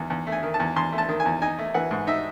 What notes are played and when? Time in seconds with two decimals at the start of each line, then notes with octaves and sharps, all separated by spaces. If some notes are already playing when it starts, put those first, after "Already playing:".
Already playing: E2 D#3 A3
0.10 E2
0.27 A3
0.32 G#5
0.43 D#3
0.54 A5
0.60 E2
0.76 E2 C6
0.92 A3
0.98 A5
1.09 D#3
1.20 G#5
1.25 E2
1.42 D#4 G#5
1.59 A3
1.74 E3 F#5
1.91 G#2
2.07 D#4 E5